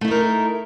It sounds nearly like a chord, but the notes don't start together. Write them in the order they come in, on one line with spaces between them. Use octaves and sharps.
A3 E4 D#4 A#4